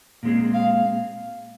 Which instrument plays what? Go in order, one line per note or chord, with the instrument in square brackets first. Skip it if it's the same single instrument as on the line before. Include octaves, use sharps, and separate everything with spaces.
[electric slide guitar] A#2 G#3 C4 G#4
[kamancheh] F5